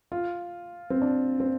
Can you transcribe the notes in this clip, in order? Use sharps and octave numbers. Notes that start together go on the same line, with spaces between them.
F4
C4
D4
C4